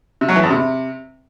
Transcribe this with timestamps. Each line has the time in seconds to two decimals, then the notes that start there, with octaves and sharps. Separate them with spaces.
0.21 C3
0.29 F#3
0.36 E3
0.43 E2
0.50 C3